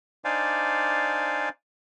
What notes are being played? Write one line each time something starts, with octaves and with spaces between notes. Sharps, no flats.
D4 D#4 C5 D5 F5 G#5